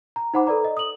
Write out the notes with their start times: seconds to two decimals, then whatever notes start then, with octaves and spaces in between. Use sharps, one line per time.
0.16 A#5
0.34 D#4 C5 F#5 B5 D6
0.47 A4 B4 D5 A#5
0.64 D#5
0.77 D#6 F#7